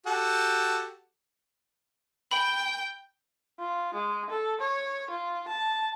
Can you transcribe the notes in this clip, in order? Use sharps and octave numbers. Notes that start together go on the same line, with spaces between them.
F#4 G4 A4
G5 B5
F4
G#3
A4
C#5
F4
A5